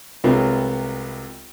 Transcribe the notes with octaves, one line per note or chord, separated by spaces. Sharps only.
C2 C3 F#3 G#3 B3 F4